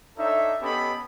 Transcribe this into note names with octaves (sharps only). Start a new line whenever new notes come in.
D4 D#4 A4 C#5 E5
B3 C#4 G4 A4 D#5 B5